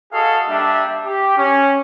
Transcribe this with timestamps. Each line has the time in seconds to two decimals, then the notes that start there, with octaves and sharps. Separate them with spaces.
0.12 F#4 G#4 A4 D#5 F5
0.48 G3 A#3 D4 E5
1.05 G4
1.37 C#4